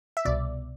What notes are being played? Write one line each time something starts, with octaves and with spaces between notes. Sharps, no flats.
E5
C2 B2 D5